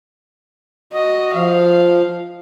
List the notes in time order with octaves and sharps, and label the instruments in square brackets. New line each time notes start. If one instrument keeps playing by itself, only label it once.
[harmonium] F#4 [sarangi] D#5
[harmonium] F3 [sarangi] F5